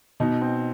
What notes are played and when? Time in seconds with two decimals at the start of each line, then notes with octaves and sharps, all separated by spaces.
0.20 B2 D#4
0.41 C4